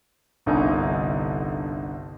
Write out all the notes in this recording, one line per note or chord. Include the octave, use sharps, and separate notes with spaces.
G1 C2 D3 D#4 D#5 G#5